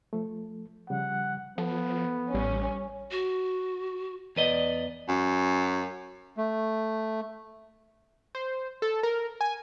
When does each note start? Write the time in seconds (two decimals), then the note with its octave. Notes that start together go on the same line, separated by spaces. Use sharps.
0.13 F3 A3
0.90 C#3 F3 G3 F#5
1.58 F3 B3 A4
2.34 A1 G3 C#4
3.11 F#4
4.36 E2 B4 D5 D#5
5.08 F#2
6.37 A3
8.35 C5
8.82 A4
9.03 A#4
9.41 G#5